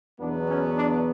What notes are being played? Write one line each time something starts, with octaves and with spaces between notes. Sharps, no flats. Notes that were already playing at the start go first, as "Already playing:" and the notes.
E2 B2 F#3 B3 D4
C#4
D4